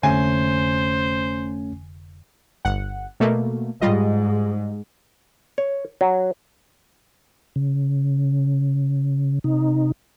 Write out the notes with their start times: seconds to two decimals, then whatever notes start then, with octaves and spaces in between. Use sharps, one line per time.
0.03 F1 D3 A3 C#4 C5 G#5
2.65 G1 F#5
3.20 B2 A3 A#3
3.81 G#2 G3 F4 D#5
5.58 C#5
6.01 F#3
7.56 C#3
9.44 C3 D#4